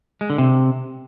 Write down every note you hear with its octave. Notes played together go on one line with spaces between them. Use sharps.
G#3
D3
C3